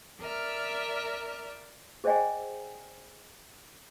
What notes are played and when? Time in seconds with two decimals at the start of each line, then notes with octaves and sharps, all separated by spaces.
0.21 A#4 D5 E5 F6
2.04 G#4 C5 D5 D#5 G5 G#5